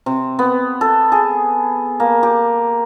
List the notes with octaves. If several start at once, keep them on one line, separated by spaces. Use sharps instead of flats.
C3
B3
A4
G#4
A#3
G4